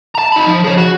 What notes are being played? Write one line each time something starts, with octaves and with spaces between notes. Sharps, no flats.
A5 A#5
D#4 B5
F3
G#4 C#5
F#4